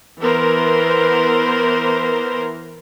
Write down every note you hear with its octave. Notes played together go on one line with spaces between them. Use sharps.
E3 B3 A#4 C5